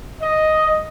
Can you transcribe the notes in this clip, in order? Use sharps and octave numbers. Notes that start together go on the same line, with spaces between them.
D#5